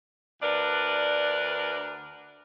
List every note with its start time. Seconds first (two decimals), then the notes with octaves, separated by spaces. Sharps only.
0.42 D2 D4 A#4 B4 D5